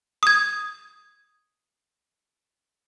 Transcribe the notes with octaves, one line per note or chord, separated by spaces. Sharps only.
D#6 G#6